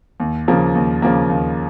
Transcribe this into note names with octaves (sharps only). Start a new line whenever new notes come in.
D#2
C#3 F3 A#3
D#2
C#3 F3 A#3
D#2